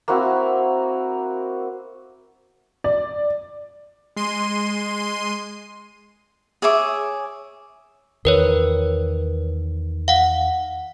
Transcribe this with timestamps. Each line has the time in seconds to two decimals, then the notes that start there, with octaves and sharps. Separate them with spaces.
0.08 A#3 C4 E4 F#4
2.84 D5
4.16 G#3 C6 D#7
6.62 G#4 C#5 E5 D6
8.25 E2 D#3 A#4 B4 C#5
10.08 F5 F#5